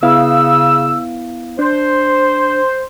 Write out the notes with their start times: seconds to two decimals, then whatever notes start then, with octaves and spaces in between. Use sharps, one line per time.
0.03 C#3 B3 E4 F5 E6
1.59 D4 C5